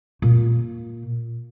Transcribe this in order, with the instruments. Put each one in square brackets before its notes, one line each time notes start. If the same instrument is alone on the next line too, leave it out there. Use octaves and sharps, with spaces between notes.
[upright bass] A#2